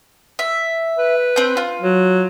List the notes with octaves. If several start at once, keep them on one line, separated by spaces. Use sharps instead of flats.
E5
B4
C4 G6
F4
F#3